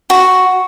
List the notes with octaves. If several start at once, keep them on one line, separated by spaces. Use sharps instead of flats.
F#4